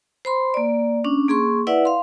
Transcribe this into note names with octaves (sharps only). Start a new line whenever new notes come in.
C5 B5 C6
A#3 D5
C#4 D4
A#3 G#4 C6 C#6
E4 B4 D5 E5 F#5
F5 C6